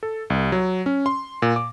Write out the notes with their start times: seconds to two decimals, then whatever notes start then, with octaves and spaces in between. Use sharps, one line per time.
0.03 A4
0.30 C2
0.52 F#3
0.86 C#4
1.06 C6
1.42 A#2
1.56 D6